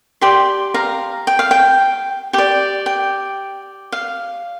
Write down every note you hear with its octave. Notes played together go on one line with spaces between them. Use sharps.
G4 D5 G5 C6
F5 A#5
G5
F5
G5
G4 D5 G5
G5
F5